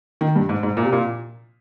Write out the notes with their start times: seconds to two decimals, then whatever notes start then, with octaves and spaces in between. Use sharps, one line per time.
0.21 D#3
0.36 G2
0.49 G#2
0.63 G#2
0.77 A#2
0.85 C3
0.92 A#2